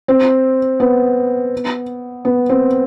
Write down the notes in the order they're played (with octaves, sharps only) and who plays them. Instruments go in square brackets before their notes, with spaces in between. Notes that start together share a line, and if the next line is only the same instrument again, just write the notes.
[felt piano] C4
B3
B3
C4